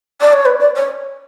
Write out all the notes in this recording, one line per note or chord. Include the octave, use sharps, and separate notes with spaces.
D5
C#5
B4
D5
C#5